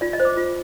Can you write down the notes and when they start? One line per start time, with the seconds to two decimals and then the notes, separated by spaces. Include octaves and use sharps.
0.01 F4 D5
0.13 D#5
0.20 C5
0.25 D6
0.37 F4